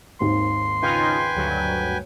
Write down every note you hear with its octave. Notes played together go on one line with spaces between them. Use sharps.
G#1 D#2 G#2 C6
C#3 D#4 F4 B4 G5 G#5
D2 G2 F#3